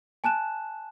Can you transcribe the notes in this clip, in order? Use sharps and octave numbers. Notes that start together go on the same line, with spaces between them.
G#5 A5 F#6 E7